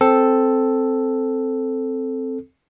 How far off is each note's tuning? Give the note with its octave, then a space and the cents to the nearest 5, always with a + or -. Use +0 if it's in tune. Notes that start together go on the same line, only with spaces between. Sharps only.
C4 +0 A4 +0